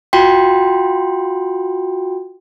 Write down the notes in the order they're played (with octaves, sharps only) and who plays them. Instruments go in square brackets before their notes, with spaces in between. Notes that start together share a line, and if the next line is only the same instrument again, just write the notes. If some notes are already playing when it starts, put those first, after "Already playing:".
[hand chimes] F4 F#4 G5 C6